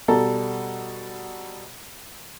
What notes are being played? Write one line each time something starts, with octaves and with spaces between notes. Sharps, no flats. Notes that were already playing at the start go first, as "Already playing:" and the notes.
B2 G3 A4 A#5